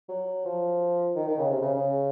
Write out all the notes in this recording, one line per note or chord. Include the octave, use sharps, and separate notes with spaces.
F#3
F3
D#3
D#3
C#3
C3
C#3
C#3